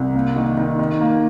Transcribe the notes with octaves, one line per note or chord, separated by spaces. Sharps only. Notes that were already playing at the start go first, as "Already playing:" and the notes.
Already playing: C2
A#3
D#3
D#3
D#3
A#3